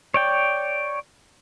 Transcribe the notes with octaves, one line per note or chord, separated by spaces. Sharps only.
C#5 D5 G5